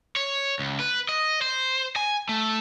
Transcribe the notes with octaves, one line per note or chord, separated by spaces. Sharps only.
C#5
C#2
B4
D#5
C5
G#5
A3